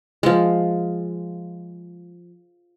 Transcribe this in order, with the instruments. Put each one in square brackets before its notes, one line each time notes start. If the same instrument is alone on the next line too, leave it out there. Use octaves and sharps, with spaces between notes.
[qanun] F3 G#3